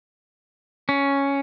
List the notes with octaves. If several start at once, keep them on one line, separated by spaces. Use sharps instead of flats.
C#4